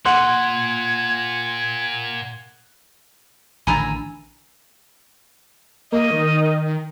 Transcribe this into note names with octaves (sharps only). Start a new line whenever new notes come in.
A#2 F#5 C6 F#6 G#6
A1 D3 D#3 D4 G#5 A#5 B5 E6
A#3 D#5
D#3